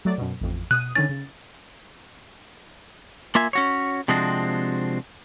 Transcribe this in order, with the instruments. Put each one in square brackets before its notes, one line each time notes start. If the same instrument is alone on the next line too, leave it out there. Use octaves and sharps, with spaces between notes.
[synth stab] F#3 A3 D5
F#2 B2
A1 F2
[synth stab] B2 D#6 D#7 [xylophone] F#6
[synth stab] D3 D#3 C#4 [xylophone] A6
[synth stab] C#3
[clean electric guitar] A#3 F4 E5 G#5
C#4 F#4 C#5
C3 F3 G#3 C4 D4 F#4